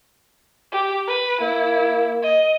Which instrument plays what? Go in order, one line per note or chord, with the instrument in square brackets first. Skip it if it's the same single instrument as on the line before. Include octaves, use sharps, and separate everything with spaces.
[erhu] G4
B4
[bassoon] A#3 [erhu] E4
[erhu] D#5